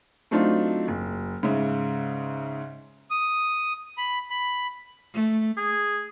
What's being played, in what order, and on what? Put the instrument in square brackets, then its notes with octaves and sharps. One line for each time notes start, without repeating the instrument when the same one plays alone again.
[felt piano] F#3 A3 C4 D4 D#4 F4
F#1
G#2 C#3 E5
[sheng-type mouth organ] D#6
B5
B5
[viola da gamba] A3
[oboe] G#4